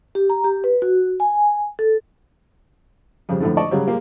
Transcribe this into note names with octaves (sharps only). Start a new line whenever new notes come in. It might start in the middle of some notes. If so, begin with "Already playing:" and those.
G4
A#5
G4
B4
F#4
G#5
A4
F2 C#3 G3
F2 A2 D3 A3
D5 D#5 A5 C#6
C#3 F#3 G3
G#3 A#3 G4